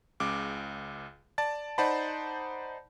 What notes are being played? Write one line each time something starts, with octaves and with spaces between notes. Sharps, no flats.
C#2 C#3 D6
D5 A5 A6
D#4 C5 D5 F#5 A5 B5